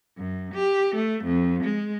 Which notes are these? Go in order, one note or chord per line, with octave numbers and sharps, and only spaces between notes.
F#2
G4
A3
F2
G#3